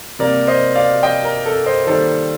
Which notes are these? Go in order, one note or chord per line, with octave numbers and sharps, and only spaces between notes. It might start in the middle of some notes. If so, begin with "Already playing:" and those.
C3 G3 A#3 A#4 D5
C5 D#5
D5 F5
D#5 G5
A#4
A4
C5 D#5
D#3 G3 A#3 A4 C5